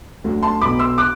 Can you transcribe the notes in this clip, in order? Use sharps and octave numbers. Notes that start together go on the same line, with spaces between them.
D2 D3 F#3
A5 C6
B1 B2 F#3 B5 D6
C6 E6
D6 F#6